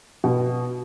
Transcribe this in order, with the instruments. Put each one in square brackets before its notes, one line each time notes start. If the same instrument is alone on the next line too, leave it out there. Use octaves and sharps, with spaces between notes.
[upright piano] B2